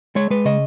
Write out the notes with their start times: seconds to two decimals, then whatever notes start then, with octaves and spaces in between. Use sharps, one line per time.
0.16 G#3 C#5
0.30 G#3 B4
0.45 C#3 D#5